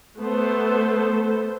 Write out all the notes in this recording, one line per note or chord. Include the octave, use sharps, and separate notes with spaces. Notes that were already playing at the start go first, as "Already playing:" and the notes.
A3 B3 A4 C5